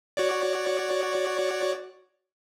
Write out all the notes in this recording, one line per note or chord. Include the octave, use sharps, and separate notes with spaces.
F#4 C#5 D5